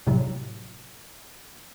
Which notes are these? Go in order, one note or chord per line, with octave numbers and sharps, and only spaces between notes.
A2 C3 F#3